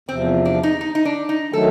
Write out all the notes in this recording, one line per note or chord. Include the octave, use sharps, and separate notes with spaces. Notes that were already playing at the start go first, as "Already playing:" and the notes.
E2 C3 F3 C4
D4
D#4
D#4
D#4
D4
D#4
D#3 F#3 A3 A4